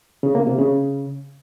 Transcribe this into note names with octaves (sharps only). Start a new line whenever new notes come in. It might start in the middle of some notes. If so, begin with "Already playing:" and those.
C#3
A#3
C3
C#3